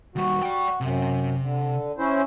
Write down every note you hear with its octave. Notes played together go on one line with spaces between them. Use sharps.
D#2 G3 F#4
D5 G5
F#2 C3
D3
C#4 E4 C5